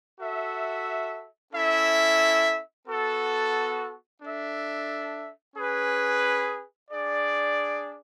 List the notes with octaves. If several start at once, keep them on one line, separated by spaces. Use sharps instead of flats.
F#4 A4 E5
C#4 E4 A4 E5
B3 F#4 A4
D4 A4 E5
C#4 G#4 B4
D4 G#4 D5